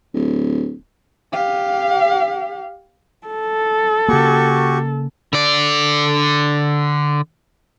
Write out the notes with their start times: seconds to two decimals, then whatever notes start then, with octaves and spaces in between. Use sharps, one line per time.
0.14 D1
1.33 G4 F5
3.27 A4
4.09 C#3 A#3 F#4 G4 C#6
5.33 D3 D5